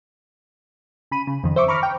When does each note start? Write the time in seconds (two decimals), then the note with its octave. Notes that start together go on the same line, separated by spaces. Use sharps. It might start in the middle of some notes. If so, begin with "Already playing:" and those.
1.11 C#3 B5 D#7
1.27 C#3
1.44 F2 D#3
1.56 C5 E5 C#6 D6
1.68 A#5 B5 C#6 D6 F6
1.83 G5